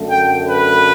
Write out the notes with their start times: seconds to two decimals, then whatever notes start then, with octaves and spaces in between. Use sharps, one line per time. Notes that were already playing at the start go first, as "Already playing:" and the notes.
Already playing: F#2 D3 A3
0.08 G5
0.47 B4